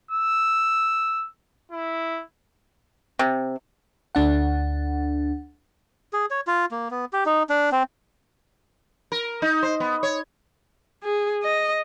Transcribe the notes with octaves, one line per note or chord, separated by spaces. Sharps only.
E6
E4
C3
D2 D4 F#5
G#4
C#5
F4
A#3
B3
G4
D#4
D4
C4
A#4
D#4
C5
B3
C#5
G#4
D#5